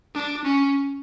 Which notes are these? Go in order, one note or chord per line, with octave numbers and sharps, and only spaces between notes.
D4
C#4